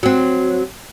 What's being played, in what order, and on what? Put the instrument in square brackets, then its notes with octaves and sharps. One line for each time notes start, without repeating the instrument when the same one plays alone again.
[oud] F#3 C4